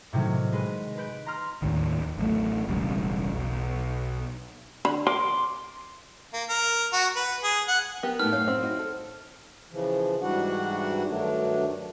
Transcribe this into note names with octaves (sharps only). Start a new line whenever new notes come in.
A2 C3 D#3 F#3
G#3 B4 D#7
B4 G6 D7
A#5 C6 F6 A#6
D#2 A2 D#3
D#2
A1 F#3 A3
E1 A1 C#3 G3
B1
D3 B5
A#4 C6 D6
A#3
A#4
F#4
B4
G#4
F#5
B3 G4 A#4
A2 A3 D#4 B4 F6
F#2 A2 C#5 F5
C4
D#4 E4 F#4
A4
C#3 E3 F3
G#2 E3 G3 D4 F#4 F#5
G2 D#3 F#3 A3 D4